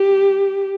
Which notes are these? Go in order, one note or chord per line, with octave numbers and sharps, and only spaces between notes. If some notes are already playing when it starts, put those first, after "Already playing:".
Already playing: G4